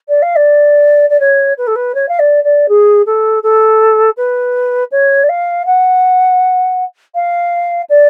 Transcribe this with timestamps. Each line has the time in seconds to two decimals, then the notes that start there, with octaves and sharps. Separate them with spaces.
0.09 D5
0.22 F5
0.36 D5
1.10 D5
1.20 C#5
1.58 B4
1.67 A4
1.76 B4
1.95 C#5
2.09 F5
2.19 D5
2.44 D5
2.69 G#4
3.06 A4
3.43 A4
4.17 B4
4.92 C#5
5.24 D5
5.29 F5
5.66 F#5
7.15 F5
7.90 D5